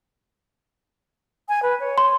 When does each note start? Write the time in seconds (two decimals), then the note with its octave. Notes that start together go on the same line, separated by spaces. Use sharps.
1.49 G#5
1.63 B4
1.80 C#5
1.98 C6